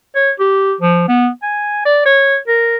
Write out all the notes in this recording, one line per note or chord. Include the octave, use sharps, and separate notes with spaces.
C#5
G4
F3
B3
G#5
D5
C#5
A#4